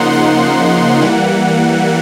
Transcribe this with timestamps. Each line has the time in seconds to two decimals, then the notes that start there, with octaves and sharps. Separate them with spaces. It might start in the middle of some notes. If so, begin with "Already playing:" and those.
Already playing: C#3 F3 A#3 D#4 F#5 C6
0.13 F#5
1.02 E3 G3 A#3